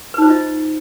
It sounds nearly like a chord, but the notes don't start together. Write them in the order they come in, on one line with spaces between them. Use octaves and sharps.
B4 D#4 C5 F4 D#5